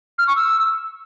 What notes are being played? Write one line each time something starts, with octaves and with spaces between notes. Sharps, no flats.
F6
C#6
E6